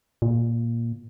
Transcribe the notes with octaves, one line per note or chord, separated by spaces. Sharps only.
A#2